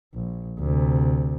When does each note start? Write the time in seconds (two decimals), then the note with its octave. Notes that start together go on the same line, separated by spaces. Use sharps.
0.14 A#1
0.59 D2 C3